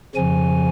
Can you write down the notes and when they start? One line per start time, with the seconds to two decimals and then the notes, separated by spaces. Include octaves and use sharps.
0.15 F2 C#3 F3 G#5